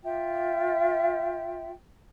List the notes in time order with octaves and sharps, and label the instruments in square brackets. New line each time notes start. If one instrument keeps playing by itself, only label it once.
[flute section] F4 E5 G5